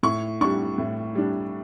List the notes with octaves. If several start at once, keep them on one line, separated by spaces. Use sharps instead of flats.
A2 C#6
G3 D4 C#6
A2
G3 D4